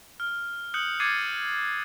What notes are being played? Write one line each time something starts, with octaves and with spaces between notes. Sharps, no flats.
F6
D#6 F#6 G6 C#7 F#7
D6 G#6 A6 C7 C#7 D#7